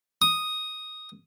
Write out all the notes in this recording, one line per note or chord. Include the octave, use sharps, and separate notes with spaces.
D#6